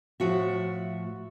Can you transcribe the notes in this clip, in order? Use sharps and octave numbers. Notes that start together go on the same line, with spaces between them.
A2 F3 F#4 E5